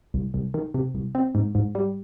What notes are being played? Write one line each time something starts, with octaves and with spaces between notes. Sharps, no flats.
C2
C2
D#3
C3
C2
C4
G#2
G#2
G3